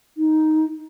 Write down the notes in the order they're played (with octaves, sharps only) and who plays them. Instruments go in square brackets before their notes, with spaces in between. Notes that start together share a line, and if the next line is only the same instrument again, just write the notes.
[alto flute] D#4